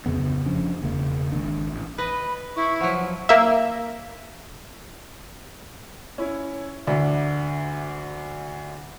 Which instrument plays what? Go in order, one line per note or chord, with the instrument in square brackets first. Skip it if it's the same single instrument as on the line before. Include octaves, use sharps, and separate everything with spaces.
[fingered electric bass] D1 F2 C#3 B3
F1 F3 C#4 D4
E1 C#3 A#3
G#1 D#3 D4
A1
[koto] B4 D#5 [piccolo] B5
[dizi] E4 [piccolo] C#6
[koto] F3 F#3 [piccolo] F#5
[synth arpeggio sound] A#3 E5
[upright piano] C#4 E4
D2 D3 D4 E5